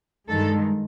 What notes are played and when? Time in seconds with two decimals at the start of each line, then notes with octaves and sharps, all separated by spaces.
0.29 G2 D#3 G#3 A4